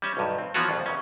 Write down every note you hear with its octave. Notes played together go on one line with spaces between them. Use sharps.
G3 C#4 E5
B1 G2 D#3
C4
E3 F3 B3 C#4 F4 F#4
C2 F2
E2 C#3 C#4